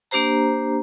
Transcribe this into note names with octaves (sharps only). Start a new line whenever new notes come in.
A#3 D4 G4 C5 A#5